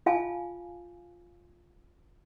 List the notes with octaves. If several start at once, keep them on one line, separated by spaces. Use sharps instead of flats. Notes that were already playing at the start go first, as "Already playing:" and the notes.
F4 F5 G#5 A5